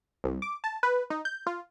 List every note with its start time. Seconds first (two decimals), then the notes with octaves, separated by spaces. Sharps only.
0.24 C2
0.42 D6
0.64 A5
0.83 B4
1.10 D#4
1.25 G6
1.47 F4